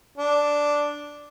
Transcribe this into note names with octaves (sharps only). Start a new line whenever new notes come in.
D4